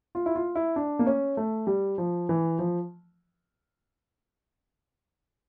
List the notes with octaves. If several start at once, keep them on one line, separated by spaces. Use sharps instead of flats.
F4
E4
F4
E4
D4
A#3
C#4
A3
G3
F3
E3
F3